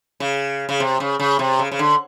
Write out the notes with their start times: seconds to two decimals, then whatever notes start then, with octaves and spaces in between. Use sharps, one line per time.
0.20 C#3
0.69 C#3
0.80 C3
1.00 C#3
1.20 C#3
1.39 C3
1.59 C#3
1.72 C#3
1.79 D3